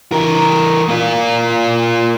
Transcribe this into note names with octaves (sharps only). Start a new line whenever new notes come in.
E3 A#4
A#3 F4